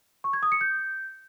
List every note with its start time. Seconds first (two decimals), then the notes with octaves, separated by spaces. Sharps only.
0.24 C#6
0.33 G#6
0.43 D#6
0.52 C#7
0.61 G6